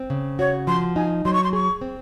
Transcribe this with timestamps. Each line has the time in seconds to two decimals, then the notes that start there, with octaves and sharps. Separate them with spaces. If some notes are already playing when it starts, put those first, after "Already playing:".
Already playing: C4
0.10 C#3
0.39 F#4 C#5
0.67 F3 C6
0.96 D#4 G#5
1.25 F#3 C6
1.33 C#6
1.44 C6
1.53 G#4 C#6
1.81 C4